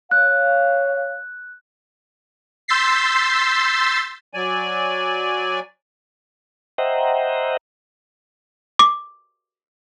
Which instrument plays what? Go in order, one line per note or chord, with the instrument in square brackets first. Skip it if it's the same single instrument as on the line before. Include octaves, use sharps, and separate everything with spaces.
[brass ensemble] C#5 F5 [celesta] F#6
[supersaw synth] C6 E6 G6 A6 B6 C7
[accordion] F#3 D5 G#5
[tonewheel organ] C5 D#5 E5 F#5 G5 A#5
[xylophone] D6